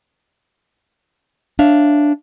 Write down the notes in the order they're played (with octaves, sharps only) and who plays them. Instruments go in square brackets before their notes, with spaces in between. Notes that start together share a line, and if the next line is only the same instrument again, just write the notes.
[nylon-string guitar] D4 C#5 E5 F5